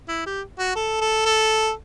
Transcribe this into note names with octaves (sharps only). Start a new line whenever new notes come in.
E4
G4
F#4
A4
A4
A4